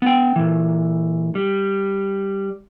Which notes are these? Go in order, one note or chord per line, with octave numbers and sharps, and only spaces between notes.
B3 G5
A#2 E3
G3